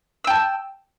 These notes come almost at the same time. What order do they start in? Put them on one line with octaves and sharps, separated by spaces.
E6 G5 A5